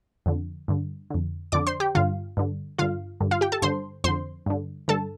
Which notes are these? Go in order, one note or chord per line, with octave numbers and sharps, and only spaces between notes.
F2 D3
G2 D3
F2 D3
F2 D3 D5 D6
C5 C6
G4 G5
G2 D3 F4 F5
G2 D3
G2 D3 F4 F5
G2 D3
F4 F5
G4 G5
A4 A5
G2 D3 C5 C6
F2 D3 C5 C6
G2 D3
G2 D3 A4 A5